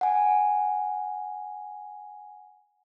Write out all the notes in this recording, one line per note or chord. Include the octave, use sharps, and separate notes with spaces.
F#5 G#5